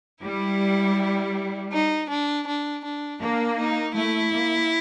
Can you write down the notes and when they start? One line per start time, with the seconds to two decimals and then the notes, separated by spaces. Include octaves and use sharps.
0.23 G3 E4
1.72 D#4
2.09 D4
2.47 D4
2.84 D4
3.22 A#3 D4
3.58 D#4
3.95 A3 E4
4.32 A#3